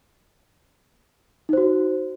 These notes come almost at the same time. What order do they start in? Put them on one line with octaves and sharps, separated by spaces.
D#4 C5 F#4